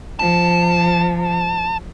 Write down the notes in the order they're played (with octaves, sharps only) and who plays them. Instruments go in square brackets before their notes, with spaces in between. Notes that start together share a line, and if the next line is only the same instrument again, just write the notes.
[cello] F3 [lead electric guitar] A5